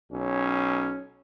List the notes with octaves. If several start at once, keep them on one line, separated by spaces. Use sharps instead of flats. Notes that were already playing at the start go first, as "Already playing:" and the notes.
B1 C#4